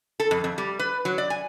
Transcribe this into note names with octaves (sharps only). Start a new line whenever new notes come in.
A4
F2
F2
G3
B4
F#3
D5
G#5